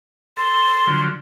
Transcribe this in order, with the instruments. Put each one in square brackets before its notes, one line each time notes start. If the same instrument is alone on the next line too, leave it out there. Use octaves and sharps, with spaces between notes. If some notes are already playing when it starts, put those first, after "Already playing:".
[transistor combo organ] A4 [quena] C6
[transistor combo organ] D3 F3 F#3